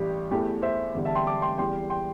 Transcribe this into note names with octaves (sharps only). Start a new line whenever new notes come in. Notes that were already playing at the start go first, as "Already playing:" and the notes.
Already playing: A1 G2 G3 G4
E2 E3 A3 G4
C5 E5
E2 D3 G3
E5 A5
G5 C6
A5 D6
G5 C6
E2 E3 G3 G5 C6
G5 C6